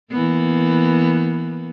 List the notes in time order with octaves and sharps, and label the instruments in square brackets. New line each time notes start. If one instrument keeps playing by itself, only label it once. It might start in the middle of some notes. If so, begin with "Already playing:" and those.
[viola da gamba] E3 A#3 B3